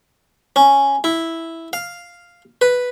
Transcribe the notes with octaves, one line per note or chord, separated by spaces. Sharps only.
C#4
E4
F5
B4